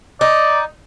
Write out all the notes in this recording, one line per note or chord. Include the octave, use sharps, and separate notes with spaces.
D#4 D5